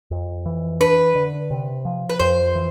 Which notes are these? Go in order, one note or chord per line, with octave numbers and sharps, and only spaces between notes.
F2
E3
D4 B4
D3
C3
F3
B4
F2 C5
E3